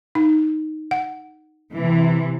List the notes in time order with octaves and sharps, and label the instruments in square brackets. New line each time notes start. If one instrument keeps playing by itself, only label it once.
[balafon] D#4
F#5
[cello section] C3 E3